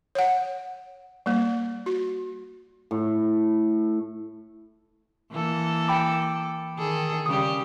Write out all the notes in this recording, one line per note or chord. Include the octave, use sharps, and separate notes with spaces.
C#5 F#5
G3 A#3
F#4
A2
E3 A#3 A4
G5 B5 D6
D#3 G#4 A4
C#3 G3 G4 D#6